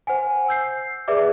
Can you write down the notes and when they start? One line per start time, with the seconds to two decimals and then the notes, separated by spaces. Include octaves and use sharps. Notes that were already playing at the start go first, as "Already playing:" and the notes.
0.07 C5 F#5 G#5
0.48 E6 G6 C7
1.08 G#4 B4 D5 E5 D6